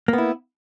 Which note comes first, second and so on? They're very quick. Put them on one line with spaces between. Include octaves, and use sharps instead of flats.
A#3 B3 E4